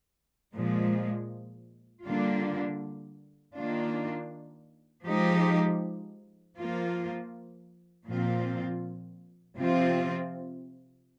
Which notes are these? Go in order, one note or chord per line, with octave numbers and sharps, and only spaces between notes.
A#2 F3 G#3
D3 G3 A#3 D4 F4
D#3 A#3 D4 F4
F3 G#3 D#4 G4
F3 A#3 F4
A#2 F3 C4 F4
C3 F3 C4 F4